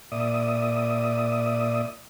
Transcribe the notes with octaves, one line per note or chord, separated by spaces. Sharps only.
A#2 D5 E5 D#6